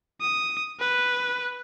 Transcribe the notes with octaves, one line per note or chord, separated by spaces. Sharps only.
D#6
B4